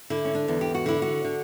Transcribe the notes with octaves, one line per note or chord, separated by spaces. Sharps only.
D3 E4
C#4
D4
E2
G4
F#4
D3 E4
F#4
D3